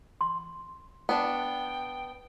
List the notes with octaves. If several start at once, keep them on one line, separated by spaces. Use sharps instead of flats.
C6
B3 D4 G5